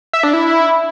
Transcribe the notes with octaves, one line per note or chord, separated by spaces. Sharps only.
E5
D4
E4